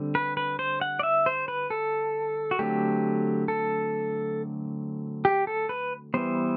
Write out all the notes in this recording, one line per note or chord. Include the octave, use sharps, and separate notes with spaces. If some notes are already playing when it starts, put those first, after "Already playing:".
Already playing: D3 G3 C4
B4
B4
C5
F#5
D5
E5
C5
B4
A4
F#4
D3 F#3 A3 C4 G4
A4
G4
A4
B4
E3 G3 B3 C5